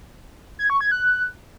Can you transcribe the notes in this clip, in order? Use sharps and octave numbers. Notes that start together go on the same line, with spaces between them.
G#6
C#6
G#6
F#6